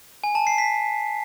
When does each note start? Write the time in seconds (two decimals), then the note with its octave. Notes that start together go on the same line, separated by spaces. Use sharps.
0.24 G#5
0.35 A5
0.47 C7
0.58 B6